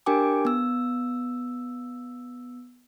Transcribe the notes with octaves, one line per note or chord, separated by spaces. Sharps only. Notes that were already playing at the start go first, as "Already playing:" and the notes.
D4 G4 A#4 G5 G#5 D6
B3 E6